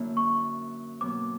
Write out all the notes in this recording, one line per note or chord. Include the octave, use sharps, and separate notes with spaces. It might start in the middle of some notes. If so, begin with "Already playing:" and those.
Already playing: F#2 D3 A#3 E4
C#6
B2 F#3 A#3 D6